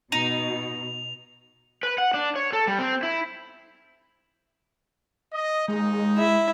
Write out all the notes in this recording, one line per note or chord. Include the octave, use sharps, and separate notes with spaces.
B2 D#4 F7
B4
F#5
D4
C#5
A4
G3
C4
E4
D#5
D#2 G#3 D#4
E4 E5